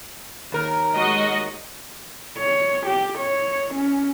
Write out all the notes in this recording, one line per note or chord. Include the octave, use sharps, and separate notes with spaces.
D#2 A#4
G#3 F#4 D#5
C#5
G4
C#5
C#4